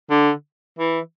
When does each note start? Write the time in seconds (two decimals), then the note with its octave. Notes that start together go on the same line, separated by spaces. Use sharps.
0.10 D3
0.79 E3